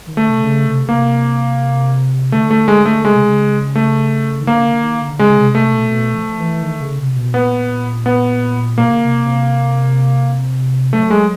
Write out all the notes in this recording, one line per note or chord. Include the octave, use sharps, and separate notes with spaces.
D#3
D3 A3
C3
C#3
C3
C#3
C3 A#3
D3 A3
A3
G#3
A3
C#3 G#3
C3
C#3
A3
D#3
D3 A#3
C#3
D3
D3
D#3
D3
D3
C#3 G#3
C3
C3 A3
B2
B2
F3
E3
D#3
C#3
C3
B2
A#2 B3
B3
B2 A#3
C#3
C3
C3
F#3 A3
G#3